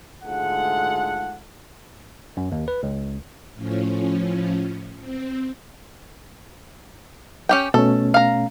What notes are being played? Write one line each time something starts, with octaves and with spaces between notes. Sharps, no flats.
D2 G#2 G#3 F4 A4 F#5
F#2
D#2
B4
C#2
A2 F3 C#4
C4
C#4 G4 G5
B2 A3 C#4 A4
F5 A#5